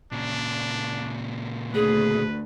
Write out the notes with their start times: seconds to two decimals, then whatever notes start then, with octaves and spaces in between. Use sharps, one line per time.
0.12 A#2 C#3 D4
1.74 D2 G#4 B4